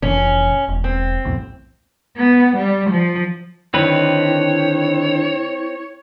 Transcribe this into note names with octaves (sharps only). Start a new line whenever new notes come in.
F1 A#2 E3 C#4
E1
C4
B1 E2 A2
B3
G3
F3
D3 D#3 C4 D4 E4 B4 C#5